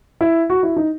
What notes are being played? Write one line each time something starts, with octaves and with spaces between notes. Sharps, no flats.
E4
F#4
E4
D#4